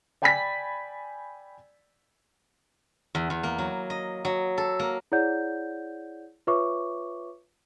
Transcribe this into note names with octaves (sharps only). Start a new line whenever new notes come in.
D5 G5 G#5 B5 A6 B6
E2
E2
A#3
F#3
D#5
F#3
A4
A#3
E4 G#4 C#5 D5 F#5 G6
F4 B4 C#5 E5 C#6 D6